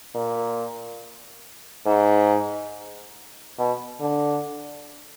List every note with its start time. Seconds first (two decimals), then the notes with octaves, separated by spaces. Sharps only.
0.15 A#2
1.86 G#2
3.58 B2
4.01 D3